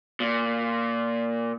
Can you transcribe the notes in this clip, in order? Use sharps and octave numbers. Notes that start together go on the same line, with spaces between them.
A#2